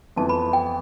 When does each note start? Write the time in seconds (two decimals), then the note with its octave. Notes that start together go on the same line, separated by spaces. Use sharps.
0.16 F2 E3 B3 A5
0.29 B5
0.53 G5